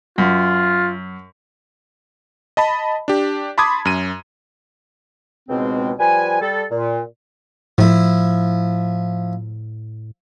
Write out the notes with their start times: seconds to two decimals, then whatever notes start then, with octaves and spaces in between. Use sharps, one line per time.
0.18 F#2 F4
2.57 D#5 A5 B5
3.08 D4 G4
3.58 A5 B5 C6 D6 D#6 G#6
3.85 F#2 D#7
5.49 C#2 G#2 B2 G#3 C4
5.99 F3 G3 B4 G#5
6.42 G3 A4
6.71 A#2
7.78 A2 F3 E4